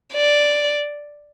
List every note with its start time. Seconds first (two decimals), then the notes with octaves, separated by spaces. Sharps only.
0.13 D5